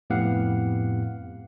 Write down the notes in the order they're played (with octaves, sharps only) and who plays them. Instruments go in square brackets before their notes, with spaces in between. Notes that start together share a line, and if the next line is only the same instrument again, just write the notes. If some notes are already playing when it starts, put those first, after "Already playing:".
[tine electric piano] F2 A2 B3 G4 F5 F#5